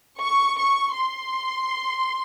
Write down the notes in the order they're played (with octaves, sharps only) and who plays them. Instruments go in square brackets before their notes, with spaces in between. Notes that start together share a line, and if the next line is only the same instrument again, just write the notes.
[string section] C#6
C#6
C6